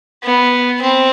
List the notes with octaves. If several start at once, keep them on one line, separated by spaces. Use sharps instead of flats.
B3
C4